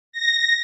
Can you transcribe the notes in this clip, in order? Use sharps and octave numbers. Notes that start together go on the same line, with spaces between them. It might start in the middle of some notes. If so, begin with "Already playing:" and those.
A#6